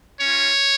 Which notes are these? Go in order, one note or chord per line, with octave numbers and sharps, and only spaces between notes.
C#4 F4 C#5